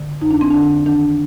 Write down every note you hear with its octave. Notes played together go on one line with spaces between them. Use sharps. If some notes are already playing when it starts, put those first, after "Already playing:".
Already playing: D3
F2 D#4
D4
C4
D3 D4
D#3 D4